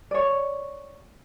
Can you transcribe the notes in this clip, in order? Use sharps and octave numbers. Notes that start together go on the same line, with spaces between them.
C#5 D5